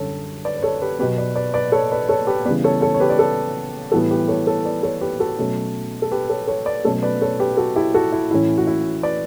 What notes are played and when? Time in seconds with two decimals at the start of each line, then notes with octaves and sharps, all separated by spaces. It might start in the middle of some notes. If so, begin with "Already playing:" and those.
Already playing: F#2 D3 G3 A4 C#5
0.45 B4 D5
0.57 B4
0.63 A4 C#5
0.81 G4 B4
0.99 B2 F#3 B3 G4 B4
1.18 B4 D5
1.36 B4 D5
1.54 B4 D5
1.72 A4 C#5
1.92 B4 D5
2.09 A4 C#5
2.27 G4 B4
2.45 C#3 E3 G3 B3 B4 D5
2.64 A4 C#5
2.82 A4 C#5
2.94 C#5
3.00 G4 B4
3.10 D5
3.19 A4 C#5
3.92 A2 E3 G3 B3 F#4 A4
4.11 G4 B4
4.28 A4 C#5
4.47 A4 C#5
4.65 B4 D5
4.83 A4 C#5
5.01 G4 B4
5.19 F#4 A4
5.38 B2 F#3 A3 C#4
6.02 A4
6.11 G4 B4
6.29 A4 C#5
6.47 A4 C#5
6.66 B4 D5
6.85 B2 F#3 A3 C#4 A4 C#5
7.03 B4 D5
7.21 A4 C#5
7.40 G4 B4
7.57 F#4 A4
7.76 E4 G4
7.94 F#4 A4
8.12 E4
8.31 A2 E3 A3 C#4 E4
8.58 F#4
8.67 E4
9.03 B4 D5